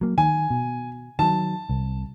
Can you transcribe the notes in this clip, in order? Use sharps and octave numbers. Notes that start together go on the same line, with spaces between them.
F#3 A#3
D#3 G#5
B2
D#3 F#3 A5
C2